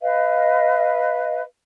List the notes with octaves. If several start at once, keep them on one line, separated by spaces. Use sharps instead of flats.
B4 D#5 F5